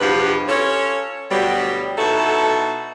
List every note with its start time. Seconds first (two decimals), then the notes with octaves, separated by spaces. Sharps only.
0.01 E2 G2 B2 F3 G4 B4
0.48 C#4 F4 A4 C#5
1.30 D2 B2 F#3 G3
1.98 B2 D#4 E4 F#4 A4